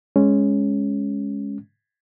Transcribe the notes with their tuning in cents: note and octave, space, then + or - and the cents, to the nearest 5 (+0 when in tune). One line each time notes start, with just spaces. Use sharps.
G#3 +0 C#4 +0